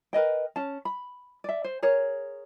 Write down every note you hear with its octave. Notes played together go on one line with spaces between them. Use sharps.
A#4 B4 D#5 G5
C#4 A5
B5
D5 E5
C5
G#4 A#4 C#5